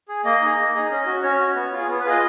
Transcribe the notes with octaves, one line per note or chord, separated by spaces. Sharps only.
G#4
A#3 D#5
D#4 G#4
A#3
D#4 G#4
C#4
F#4
C#4 C#5
F#4
B3
F4 G#4
B3
B4
F4 G#4 D#5